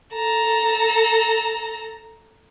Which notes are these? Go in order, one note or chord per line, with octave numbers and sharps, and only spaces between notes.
A4 A#5